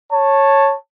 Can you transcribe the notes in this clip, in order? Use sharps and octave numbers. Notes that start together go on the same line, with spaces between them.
C#5 A5